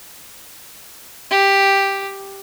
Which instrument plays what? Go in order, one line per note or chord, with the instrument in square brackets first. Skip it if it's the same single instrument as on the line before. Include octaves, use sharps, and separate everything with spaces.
[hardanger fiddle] G4